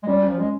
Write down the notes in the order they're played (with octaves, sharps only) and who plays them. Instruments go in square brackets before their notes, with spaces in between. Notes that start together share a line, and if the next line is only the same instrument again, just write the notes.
[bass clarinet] G#3
[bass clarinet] G3 [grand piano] C#4
[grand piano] C#4
[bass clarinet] F3
[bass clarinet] G#3 [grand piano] C#4